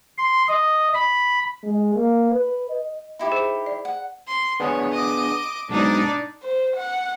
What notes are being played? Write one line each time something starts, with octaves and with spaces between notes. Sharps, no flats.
C6
D#5
B5
G#3
A#3
B4
D#5
D#4 E4 G4
G#4 C5
D5
F#5
C6
B3 D4 G#4 C#5
D#5 D6
B1 G#2 B2 D4 D#4 D5
C5
F#5